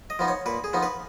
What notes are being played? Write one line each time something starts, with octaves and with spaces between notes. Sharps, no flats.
D#5
F3 B3 D#4
C#5
A#2 B4
G#4
F3 B3 D#4
B4